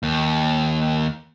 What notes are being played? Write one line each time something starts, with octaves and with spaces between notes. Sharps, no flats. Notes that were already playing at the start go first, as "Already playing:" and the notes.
D#2